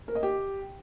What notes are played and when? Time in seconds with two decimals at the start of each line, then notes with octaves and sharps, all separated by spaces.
0.08 A#4
0.15 D#5
0.23 G4